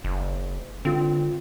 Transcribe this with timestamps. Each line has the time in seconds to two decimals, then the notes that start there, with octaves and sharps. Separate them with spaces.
0.04 F#1
0.85 D3 C4 F4